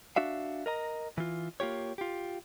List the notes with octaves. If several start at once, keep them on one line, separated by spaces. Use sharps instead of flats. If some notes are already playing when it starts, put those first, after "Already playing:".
D4 F#4 E5 F5
A#4 D#5 A#5
E3 F4
A#3 F4 G4 C#5
F4 G4